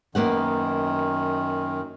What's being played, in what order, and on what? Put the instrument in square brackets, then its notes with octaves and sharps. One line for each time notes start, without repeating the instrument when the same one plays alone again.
[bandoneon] F#2 D#3 [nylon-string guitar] A#3 B3 F#5